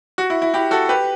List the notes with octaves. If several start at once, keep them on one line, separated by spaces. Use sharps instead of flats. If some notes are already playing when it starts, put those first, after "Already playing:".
F#4
E4
E4
E4 G4
F#4 A4
G4 B4